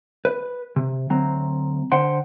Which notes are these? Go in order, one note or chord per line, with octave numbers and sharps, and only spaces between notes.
B4
C3
D2 F#3 C4 A#5
D3 C5 F#5 G5 C6